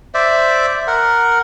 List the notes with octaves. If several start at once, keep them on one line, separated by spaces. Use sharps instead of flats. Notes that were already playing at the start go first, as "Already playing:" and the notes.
C5 D5 E5
A#4 F#5